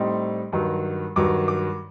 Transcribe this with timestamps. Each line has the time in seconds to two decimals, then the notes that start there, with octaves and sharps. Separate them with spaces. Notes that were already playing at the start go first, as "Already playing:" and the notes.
Already playing: A2 G3 C4 D#4 C6
0.52 G2 D#3 F#3
1.16 G2 D#3 F#3 D6
1.48 D6